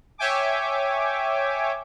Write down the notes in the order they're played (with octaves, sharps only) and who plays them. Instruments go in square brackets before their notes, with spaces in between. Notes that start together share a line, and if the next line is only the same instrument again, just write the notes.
[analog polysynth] C#5 E5 G5 G#5 D6